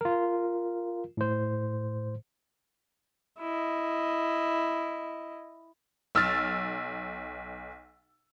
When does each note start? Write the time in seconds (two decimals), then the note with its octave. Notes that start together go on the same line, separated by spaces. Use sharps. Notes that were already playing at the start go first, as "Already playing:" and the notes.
0.01 F4 A#4
1.17 A2 C5
3.40 E4 D#5
6.15 B1 E6 F6 A6